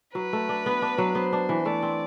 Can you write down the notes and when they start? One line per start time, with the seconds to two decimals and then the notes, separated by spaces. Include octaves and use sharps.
0.15 F#3 B4
0.33 A3
0.49 D4
0.66 B3
0.82 D4
0.98 F#3
1.15 B3 C5
1.33 D4
1.49 E3
1.65 A3 D5
1.83 C4